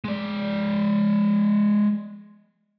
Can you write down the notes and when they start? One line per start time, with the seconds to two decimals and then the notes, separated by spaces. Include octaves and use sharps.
0.04 G#3 D5